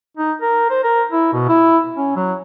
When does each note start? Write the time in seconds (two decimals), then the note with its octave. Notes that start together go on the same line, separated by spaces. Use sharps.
0.17 D#4
0.42 A#4
0.70 C5
0.84 A#4
1.12 E4
1.33 B2
1.49 E4
1.96 C#4
2.16 F#3